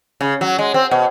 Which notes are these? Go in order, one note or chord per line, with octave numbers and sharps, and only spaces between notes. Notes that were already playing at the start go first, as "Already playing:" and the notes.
C#3
F#3
G#3
C4
B2